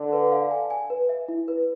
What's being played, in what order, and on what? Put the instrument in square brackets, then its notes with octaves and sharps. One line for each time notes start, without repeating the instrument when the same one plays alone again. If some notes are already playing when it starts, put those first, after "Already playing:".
Already playing: [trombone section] D3
[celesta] B4
F5
G#5
G#5
B4
E5
E4
B4